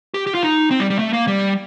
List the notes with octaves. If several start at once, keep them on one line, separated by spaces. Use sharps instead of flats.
G4
G4
F4
D#4
C4
G3
G3
A3
A#3
G3